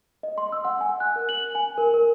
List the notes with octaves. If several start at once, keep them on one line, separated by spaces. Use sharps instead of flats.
D#5
C6
E6
F#5
G#5
F#6
A#4
F#7
G#5
A#4
A#4